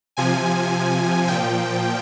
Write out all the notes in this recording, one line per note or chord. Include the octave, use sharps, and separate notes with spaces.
C3 F3 G#5
A#2 F3 G5